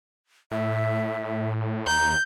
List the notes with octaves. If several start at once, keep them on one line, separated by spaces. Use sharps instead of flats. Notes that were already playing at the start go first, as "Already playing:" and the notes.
A2 E5
D#2 A#5 G6